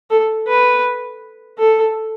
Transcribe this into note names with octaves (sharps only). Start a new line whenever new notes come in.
A4
B4
A4